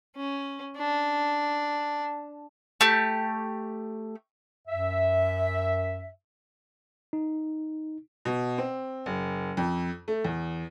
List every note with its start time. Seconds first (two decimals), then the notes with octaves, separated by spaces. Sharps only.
0.16 C#4
0.77 D4
2.81 A3 G4
4.68 F#2 E5
7.13 D#4
8.25 B2
8.58 C4
9.06 F#1
9.57 F2
10.08 A3
10.25 E2